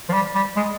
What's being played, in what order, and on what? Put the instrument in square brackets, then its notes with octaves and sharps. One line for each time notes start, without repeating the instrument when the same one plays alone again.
[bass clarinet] F3
G3
G3
G#3